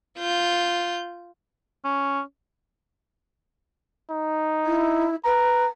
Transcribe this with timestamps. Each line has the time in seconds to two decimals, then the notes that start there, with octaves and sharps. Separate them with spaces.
0.18 F4 G6
1.84 C#4
4.10 D#4
4.65 E4
5.24 B4 A#5